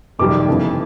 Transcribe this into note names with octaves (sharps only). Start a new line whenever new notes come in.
F#1 F2 C3 D#3 G3 D6
G1 F2 C#3 E3